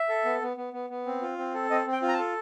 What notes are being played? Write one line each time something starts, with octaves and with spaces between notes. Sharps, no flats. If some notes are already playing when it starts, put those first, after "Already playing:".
Already playing: E5
A4
B3
B3
B3
B3
B3
C4
F4
C4
A4
C4 D#5
C4
G5
F4
A#5
A5
A4